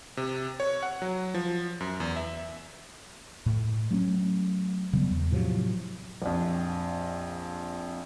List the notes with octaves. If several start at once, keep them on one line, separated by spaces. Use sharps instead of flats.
C3
C#5
F#5
F#3
F3
F#2
E2
E5
A2
F#3 A3 B3 C#4
C#3 F#3 G3 B3
E2
A2 C3 F3 F#3
A#1 F2